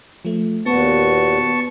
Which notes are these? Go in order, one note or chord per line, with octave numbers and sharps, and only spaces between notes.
F3 A3
D#2 A#2 B3 F#4 B4 A5 C#6